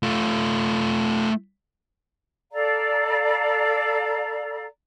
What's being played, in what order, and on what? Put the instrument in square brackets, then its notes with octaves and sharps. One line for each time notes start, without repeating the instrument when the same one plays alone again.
[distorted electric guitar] A3 F4
[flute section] A4 D5 F5 A#5